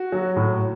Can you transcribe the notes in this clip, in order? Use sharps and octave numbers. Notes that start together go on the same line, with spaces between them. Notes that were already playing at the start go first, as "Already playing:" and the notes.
Already playing: F#4
F#3
A2